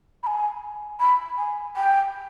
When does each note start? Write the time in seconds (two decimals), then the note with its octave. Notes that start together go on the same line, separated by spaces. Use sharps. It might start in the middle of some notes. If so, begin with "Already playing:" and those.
0.23 B5
0.27 G#5
1.00 B5
1.38 G#5
1.77 G5